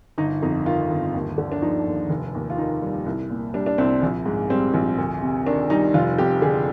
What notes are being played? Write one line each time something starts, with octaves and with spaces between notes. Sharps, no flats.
G1 D#4
F2 D#4
D#3 F4
G1
D#2
D3
D4
F3 D#4
D#2
F1
D#2
F4
D#3 D#4
G3
C2
A#2
G3 D4
D4
C2 C4
A#1
G#2
G3 C4
A#1
D2
C3
D#3 D4
G3 D#4
F1 F4
F2 G4
D3 G#4